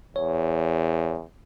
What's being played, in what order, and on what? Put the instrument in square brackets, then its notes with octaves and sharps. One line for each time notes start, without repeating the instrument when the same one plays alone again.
[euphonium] E2 [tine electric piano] C#5